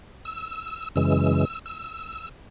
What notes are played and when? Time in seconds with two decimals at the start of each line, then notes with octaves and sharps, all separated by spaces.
0.25 E6
0.96 F#2 C#3 E3 G#3 E6
1.66 E6